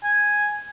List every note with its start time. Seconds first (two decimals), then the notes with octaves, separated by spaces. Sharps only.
0.04 G#5